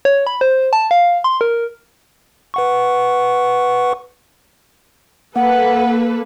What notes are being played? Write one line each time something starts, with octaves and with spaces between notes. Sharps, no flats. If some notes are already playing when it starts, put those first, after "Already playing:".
C#5
B5
C5
A5
F5
C6
A#4
B4 F#5 C#6
A#3 A4 B4 F#5